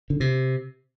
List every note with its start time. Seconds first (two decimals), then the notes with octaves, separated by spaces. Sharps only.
0.10 D3
0.20 C3